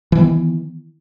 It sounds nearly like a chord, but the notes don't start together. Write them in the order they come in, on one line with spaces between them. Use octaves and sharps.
E3 D#3 B3